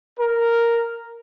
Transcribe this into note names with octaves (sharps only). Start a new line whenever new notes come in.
A#4